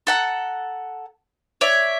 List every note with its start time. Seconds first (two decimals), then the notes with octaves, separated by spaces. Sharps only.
0.07 A4 F#5 A#5
1.61 C#5 D5 E5